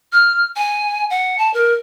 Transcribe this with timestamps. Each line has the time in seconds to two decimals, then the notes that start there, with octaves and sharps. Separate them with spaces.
0.12 F6
0.56 G#5
1.10 F#5
1.38 A5
1.54 A#4